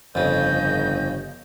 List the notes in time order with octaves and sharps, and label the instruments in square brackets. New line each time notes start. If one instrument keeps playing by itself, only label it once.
[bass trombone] G1 [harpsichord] F2 C#3 [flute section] D#5 G6